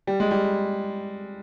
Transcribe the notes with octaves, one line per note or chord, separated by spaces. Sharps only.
G3
G#3
G3